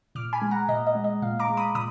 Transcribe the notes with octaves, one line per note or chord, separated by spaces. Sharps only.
A#2 D6 F6
G#5 B5
G#3
F#5 A#5
A#2 D#5
D#5
G#3
D#5
A#2 F5
A#5 D6
G#3
B5 D#6
A#2 B5 D#6